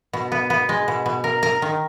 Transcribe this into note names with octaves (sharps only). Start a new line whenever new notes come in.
B2
B3
B3
G#3
B2
B2
A#4
A#4
D#3